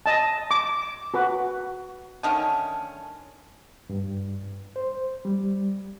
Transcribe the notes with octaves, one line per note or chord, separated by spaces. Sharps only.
D#5 A5
D6
F#4 B4
D3 D#3 A3 C#4
G2
C5
G3